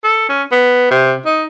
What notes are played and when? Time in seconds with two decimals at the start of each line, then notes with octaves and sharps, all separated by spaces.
0.04 A4
0.29 C#4
0.51 B3
0.91 C3
1.25 D#4